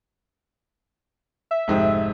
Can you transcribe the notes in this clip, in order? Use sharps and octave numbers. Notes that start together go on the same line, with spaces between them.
E5
F1 G#2 G4